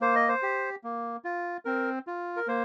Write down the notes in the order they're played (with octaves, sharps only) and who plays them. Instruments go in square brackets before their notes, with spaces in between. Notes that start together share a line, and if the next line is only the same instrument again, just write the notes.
[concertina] A#3 C5
D#5
C5
G4
A#3
F4
C4 A#4
F4
A#4
A#3 C5